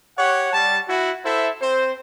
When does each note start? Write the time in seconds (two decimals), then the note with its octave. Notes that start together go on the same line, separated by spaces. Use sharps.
0.18 G4 C#5 F#5
0.53 G3 A5
0.89 E4 F#4
1.25 E4 A4 C5 E5
1.62 C4 C5